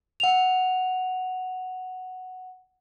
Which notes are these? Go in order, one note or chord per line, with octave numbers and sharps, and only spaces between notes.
F#5 F7